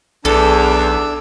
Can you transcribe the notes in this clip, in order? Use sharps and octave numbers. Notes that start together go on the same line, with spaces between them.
B1 E2 D4 A4 D6 E6